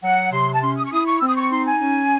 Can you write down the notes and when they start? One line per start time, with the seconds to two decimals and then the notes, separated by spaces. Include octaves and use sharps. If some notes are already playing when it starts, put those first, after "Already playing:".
0.03 F#3 F#5
0.32 C3 C6
0.54 A5
0.62 C#4 C6
0.78 D#6
0.86 C#6
0.92 E4 D#6
1.07 C#6
1.21 C4 E6
1.29 D#6
1.37 C#6
1.52 D#4 C6
1.67 G#5
1.81 C#4